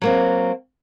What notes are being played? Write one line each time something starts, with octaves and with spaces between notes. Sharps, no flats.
F#3 A#3 C4